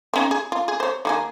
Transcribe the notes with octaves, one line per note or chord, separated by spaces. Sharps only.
C4 C#4 D#4
G#4
F4
G#4
C5 C#5
D#3 A#3 G#4